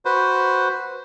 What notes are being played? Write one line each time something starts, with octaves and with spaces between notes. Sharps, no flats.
F#4 B4 C5